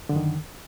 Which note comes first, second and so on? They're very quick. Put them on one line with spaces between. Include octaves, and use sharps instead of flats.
D3 F#2 D#3